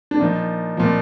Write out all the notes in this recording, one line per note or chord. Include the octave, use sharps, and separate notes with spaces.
D4
A#2 F3 D#4
A#2 F3